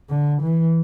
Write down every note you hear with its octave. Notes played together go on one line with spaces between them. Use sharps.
D3
E3